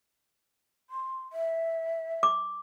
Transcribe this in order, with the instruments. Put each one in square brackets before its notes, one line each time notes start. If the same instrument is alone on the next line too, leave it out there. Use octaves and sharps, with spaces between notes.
[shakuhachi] C6
E5
[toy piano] D6